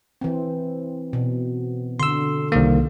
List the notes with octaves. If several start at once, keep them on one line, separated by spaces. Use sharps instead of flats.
E3 C4
B2
D3 C6 E6
C2 D#3 A#3